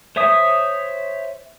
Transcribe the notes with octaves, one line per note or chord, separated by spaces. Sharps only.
C5 C#5 E5 D#6